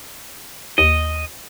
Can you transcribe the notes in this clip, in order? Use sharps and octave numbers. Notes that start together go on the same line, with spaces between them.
D#2 D#5